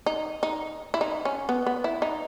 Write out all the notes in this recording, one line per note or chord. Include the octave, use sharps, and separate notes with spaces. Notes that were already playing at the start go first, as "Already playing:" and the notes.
D#4
D#4
E4
D#4
C#4
B3
B3
E4
D#4